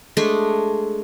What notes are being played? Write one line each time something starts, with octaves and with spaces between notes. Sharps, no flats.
G#3 A3 D4 G#4